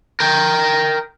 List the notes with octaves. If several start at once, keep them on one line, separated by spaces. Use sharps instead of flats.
A#4 G5